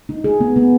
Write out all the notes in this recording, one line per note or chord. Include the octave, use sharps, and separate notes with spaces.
D#4
G#4
B3
B3